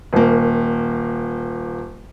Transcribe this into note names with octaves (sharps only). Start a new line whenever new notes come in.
D#1 A#3